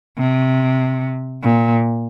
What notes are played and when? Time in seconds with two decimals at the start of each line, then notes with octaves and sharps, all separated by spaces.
0.18 C3
1.43 A#2